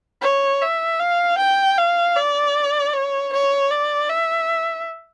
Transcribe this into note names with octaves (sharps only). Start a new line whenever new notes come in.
C#5
E5
F5
G5
F5
D5
C#5
C#5
D5
E5